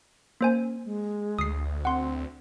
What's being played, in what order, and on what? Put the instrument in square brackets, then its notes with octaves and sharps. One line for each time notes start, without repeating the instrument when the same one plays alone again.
[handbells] A#3 C5 G#5 [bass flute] C#4
[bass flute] G#3
[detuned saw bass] D2 [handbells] D#6 C7
[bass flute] C4 [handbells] F#5 C6